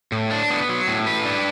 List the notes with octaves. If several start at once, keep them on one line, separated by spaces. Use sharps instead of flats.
A2
D4
B3
F#3
A2
B4
D4